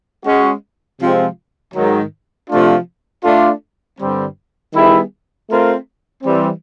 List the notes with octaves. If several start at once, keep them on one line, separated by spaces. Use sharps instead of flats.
G#3 C#4 F#4
C3 F3 G#3 C4 F4
G#2 D#3 F#3
C3 F3 A3 D4 F4
A3 D4 F4
G2 D3 G3 C4
D#3 G3 B3 E4 G#4
A3 C4 F4 A#4
E3 G3 C4